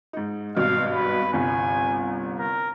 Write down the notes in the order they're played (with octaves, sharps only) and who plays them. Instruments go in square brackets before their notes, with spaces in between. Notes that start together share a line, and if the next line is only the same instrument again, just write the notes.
[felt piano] G#2 D#4
[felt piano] G#1 G2 B2 [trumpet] F5
[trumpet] B4
[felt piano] G1 C2 [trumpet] G#5
[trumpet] A#4